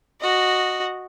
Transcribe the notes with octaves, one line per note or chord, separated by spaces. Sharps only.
F#4 D#5